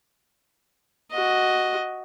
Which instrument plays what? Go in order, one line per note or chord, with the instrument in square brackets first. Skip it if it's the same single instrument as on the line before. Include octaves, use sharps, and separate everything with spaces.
[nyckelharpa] F#4 D#5